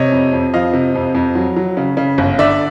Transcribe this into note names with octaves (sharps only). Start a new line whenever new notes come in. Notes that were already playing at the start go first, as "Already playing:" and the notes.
Already playing: C3 C#5 D#5
F2
F2
F3 D#5 F5
C3
F2
F2
F#3
F#3
C#3
C#3
G1
D3 D5 E5